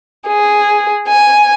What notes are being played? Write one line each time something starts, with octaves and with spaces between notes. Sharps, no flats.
G#4
G#5